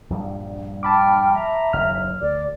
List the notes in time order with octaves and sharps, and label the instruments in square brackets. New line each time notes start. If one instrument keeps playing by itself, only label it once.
[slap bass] A#1 G2 G3
[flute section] G5 F6 [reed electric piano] A5 B5 D6
[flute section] E5 A#5
[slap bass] F#1 D#2 [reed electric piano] F6
[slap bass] D2 [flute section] D5 D6